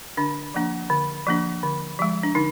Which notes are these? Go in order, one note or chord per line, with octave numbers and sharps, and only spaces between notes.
D3 D4
F3 A#3 D4
D3
F3 A#3 D4
D3
F3 G#3
D4
D3 D#4